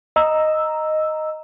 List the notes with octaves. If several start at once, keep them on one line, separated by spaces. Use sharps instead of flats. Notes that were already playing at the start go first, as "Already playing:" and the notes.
D#5 A#5 E6